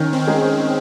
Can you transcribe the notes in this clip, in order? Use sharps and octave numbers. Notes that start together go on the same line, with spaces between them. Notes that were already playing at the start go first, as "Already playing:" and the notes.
Already playing: D#3 C#4
C4
G#3 D#4 G#4